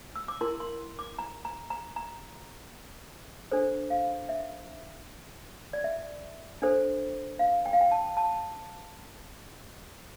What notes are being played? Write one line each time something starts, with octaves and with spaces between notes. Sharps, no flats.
E6
D6
E4 A#4 C6
C6
D6
A#5
A#5
A#5
A#5
D4 A4 C5
F5
E5
D5
E5
D4 A4 C5
F5
G5
F5
G5
A5
A5